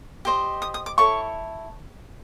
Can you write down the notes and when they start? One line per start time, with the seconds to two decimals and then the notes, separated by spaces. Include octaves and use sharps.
0.25 G4 C5 D#5
0.62 D#6
0.74 D#6
0.86 D6
0.98 E4 A4 C#5 C#6